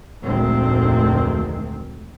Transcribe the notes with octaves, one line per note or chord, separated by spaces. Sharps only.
F1 D2 A#2 D#3 G#3 C4